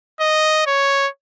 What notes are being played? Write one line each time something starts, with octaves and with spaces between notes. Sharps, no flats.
D#5
C#5